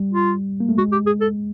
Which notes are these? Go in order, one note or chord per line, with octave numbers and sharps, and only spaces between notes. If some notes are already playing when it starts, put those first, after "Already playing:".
Already playing: G3
F4
A#3
A3
G#3 F#4
G4
G#4
A4